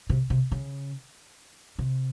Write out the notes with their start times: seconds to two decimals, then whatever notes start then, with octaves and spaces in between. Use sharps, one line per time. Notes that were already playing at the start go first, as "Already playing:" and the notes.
0.10 C3
0.30 C3
0.52 C#3
1.79 C3